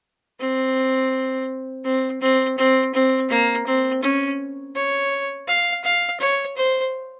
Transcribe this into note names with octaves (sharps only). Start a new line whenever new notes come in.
C4
C4
C4
C4
C4
A#3
C4
C#4
C#5
F5
F5
C#5
C5